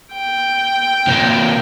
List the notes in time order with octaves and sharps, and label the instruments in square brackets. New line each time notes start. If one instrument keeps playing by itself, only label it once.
[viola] G5
[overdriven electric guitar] C3 A#3